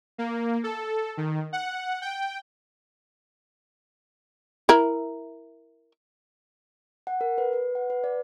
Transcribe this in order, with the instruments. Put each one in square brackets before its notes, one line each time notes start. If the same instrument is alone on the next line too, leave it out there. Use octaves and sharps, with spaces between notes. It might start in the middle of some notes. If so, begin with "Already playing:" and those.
[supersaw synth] A#3
A4
D#3
F#5
G5
[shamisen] E4 A#4
[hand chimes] F#5
A#4
B4
B4
F#5
B4
D5